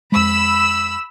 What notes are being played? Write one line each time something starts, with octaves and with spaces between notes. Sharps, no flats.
F2 G#3 B5 E6